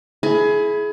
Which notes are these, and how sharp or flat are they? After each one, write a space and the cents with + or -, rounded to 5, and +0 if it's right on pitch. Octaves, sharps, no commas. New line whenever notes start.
E4 +0 G#4 +25